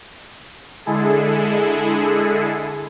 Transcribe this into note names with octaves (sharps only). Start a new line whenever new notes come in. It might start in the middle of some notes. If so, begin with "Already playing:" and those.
D3 G#3 E4 G#4 A4